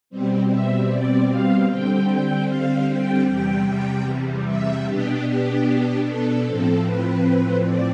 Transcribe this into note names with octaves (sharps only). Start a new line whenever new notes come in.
B2 G3 C4
E5
D5
F5
D3 G3 C4 G5
G5
F5
G5
E2 C3 G3 G5
G5
E5
B2 B3 D4 G4
G4
A4
A2 F3 C4 A4
B4
D5